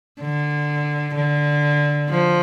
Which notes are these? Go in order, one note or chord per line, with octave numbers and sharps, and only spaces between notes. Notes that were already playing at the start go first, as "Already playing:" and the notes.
D3
D3
F3